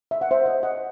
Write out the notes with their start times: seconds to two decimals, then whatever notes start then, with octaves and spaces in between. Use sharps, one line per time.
0.11 E5
0.21 F#5
0.31 C5 E5
0.46 D#5 F#5
0.63 D#5 F#5